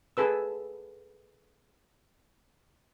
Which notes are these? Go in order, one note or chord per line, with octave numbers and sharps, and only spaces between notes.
G#4 A4 B4 E6